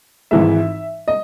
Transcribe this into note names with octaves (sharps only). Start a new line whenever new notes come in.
G#1 G#2 E3 G#3 E5
D#5